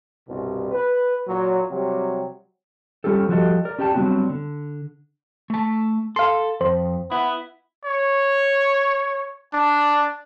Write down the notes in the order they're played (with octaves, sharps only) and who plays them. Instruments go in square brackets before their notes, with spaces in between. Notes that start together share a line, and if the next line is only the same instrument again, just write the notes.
[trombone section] C2 G2 B2
B4
A#2 F#3
C3 F#3 G3
[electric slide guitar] G3 C#4 F4 G4 A4
F3 G3 F#4 G4 A4 D#5
A#4 D5
C#4 G4 D5 G5 A5
F#3 G3 B3 C4 D4 F#4
D3
A3 A5
[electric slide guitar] A4 [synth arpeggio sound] F5 C6
[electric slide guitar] F2 [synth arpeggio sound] C5
[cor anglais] B3 [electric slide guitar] E4
[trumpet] C#5
D4